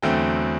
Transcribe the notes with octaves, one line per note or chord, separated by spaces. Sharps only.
E2 D3 F#3 A3 C4 G5